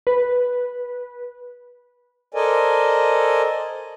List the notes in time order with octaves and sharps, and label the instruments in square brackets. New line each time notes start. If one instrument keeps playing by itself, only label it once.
[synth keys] B4
[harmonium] A4 A#4 C5 D5 D#5 G#5